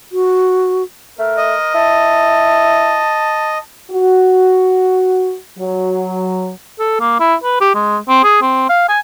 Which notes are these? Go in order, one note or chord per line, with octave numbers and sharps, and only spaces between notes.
F#4
A3 A#4
D#5
E4 A5
F#4
F#3
A4
A#3
E4
B4
G4
G#3
C4
G#4
C4
F5
G#5